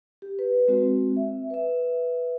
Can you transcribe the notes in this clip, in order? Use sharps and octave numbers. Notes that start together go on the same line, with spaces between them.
G4
B4
G#3 C4 F#4
E5
B4 E5